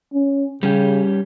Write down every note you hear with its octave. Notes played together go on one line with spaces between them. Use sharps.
C#4
C#3 G3 C#4 G4